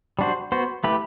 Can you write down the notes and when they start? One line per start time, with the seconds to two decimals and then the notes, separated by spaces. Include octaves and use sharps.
0.19 G3 D4 F#4 C5
0.52 B3 F#4 C5
0.84 A3 E4 G4 B4